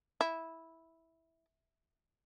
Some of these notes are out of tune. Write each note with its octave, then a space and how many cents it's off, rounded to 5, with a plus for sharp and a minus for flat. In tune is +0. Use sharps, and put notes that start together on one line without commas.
E4 -10